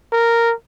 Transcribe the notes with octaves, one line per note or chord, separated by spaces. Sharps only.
A#4